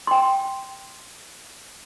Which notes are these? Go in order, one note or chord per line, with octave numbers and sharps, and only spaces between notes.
G5 C6